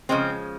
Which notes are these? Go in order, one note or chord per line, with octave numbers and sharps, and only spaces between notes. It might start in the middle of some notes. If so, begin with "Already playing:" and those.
C#3 F3 G#3 C4